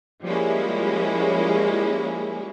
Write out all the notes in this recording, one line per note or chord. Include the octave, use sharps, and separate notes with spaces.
F3 G3 G#3 A#3 C#4 E4